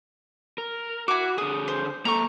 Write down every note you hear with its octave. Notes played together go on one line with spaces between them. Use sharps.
A#4
E4 F#4 D6
D3 G#4 D#6
C5
A#3 A4 A#5 C#6